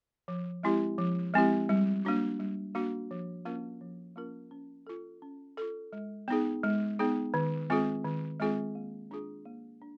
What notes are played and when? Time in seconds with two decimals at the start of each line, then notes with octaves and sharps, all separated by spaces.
0.28 F3
0.63 G#3 C4 E4 G4
0.98 F3
1.34 G#3 C4 E4 G4
1.69 G3
2.05 A#3 D4 F#4
2.40 G3
2.75 A#3 D4 F#4
3.11 F3
3.45 A#3 C#4 F4 A#4
3.81 F3
4.16 A#3 C#4 F4 A#4
4.51 C#4
4.87 F4 A4
5.22 C#4
5.57 F4 A4
5.93 G#3
6.28 B3 D#4 G#4
6.64 G#3
6.99 B3 D#4 G#4
7.34 D#3
7.70 G#3 C4 F4 G#4
8.05 D#3
8.40 G#3 C4 F4 G#4
8.75 A#3
9.11 D4 F4 G#4
9.45 A#3
9.82 D4